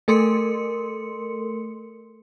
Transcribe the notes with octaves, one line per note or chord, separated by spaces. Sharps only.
A3 A4 A#4 C6 C#7